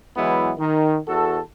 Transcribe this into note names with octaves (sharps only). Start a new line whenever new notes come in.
E3 F#3 G#3 B3 E4
D#3
E2 F#4 A4